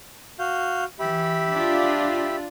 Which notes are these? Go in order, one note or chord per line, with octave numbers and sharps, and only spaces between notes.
F#4 F5 G6
E3 G4 E5 B5
D4 F4